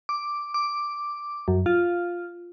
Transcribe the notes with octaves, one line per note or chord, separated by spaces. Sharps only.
D6
D6
F#2
F4